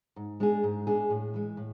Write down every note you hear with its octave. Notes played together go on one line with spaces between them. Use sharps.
G#2
G#3 D4 G#4
G#2
G#3 D4 G#4
A2
E3 G#3
A2